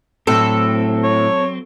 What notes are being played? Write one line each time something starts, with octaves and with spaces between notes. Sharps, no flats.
A2 F#3 C4 A4
C#5